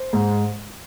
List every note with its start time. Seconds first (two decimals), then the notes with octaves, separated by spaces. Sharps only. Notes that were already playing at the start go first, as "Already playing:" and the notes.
Already playing: C5
0.13 G#2